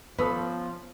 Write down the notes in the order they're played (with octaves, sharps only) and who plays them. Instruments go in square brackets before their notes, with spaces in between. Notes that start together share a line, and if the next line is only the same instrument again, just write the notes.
[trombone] F3 [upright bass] B3 [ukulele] C#4 A4 [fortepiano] B4 D#6 E6